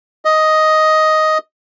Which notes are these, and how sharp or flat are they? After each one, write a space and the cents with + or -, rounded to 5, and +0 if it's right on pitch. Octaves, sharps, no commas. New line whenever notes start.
D#5 +5